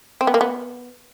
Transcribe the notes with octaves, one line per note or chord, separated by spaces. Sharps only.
C4
B3
A#3
B3